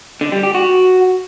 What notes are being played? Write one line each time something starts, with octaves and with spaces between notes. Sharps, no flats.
D3
G3
G4
F#4